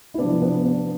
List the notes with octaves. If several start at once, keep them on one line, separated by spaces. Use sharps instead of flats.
E4
C3 F3 B3 D4
B3 D4
B3 D4